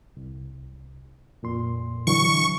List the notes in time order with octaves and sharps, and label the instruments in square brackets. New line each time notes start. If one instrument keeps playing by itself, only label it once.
[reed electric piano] C2
F2 A#2 C6
[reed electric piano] D3 E3 F#3 [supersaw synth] C#6